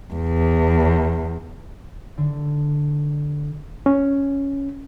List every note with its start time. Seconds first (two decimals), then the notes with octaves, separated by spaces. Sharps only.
0.14 E2
2.18 D3
3.86 C#4